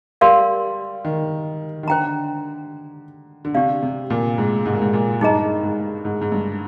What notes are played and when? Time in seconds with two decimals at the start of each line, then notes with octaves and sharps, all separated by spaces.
0.21 G3 A#4 D5 F5 C6
1.05 D#3
1.83 D#3
1.88 D3 C5 G5 A#5
3.45 D3
3.54 C3 D4 G4 D5 F5
3.83 C3
4.10 A#2
4.38 G#2
4.66 G#2
4.73 A#2
4.82 G#2
4.93 A#2
5.21 G2 D#4 G#4 D#5 A#5
5.63 G#2
6.05 G#2
6.21 G#2
6.32 G2